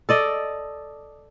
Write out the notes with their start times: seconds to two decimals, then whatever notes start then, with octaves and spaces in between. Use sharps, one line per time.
0.09 A4 D5 D#5